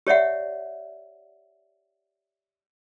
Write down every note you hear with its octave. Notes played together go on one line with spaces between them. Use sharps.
G4 C#5 D5 E5 F#5